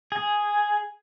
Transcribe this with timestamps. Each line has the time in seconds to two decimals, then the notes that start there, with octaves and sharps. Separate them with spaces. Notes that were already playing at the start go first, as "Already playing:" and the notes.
0.12 G#4